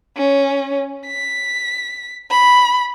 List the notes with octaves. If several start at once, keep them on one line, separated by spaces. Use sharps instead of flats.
C#4
B6
B5